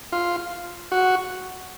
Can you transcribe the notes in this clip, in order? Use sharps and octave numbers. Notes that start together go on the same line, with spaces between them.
F4
F#4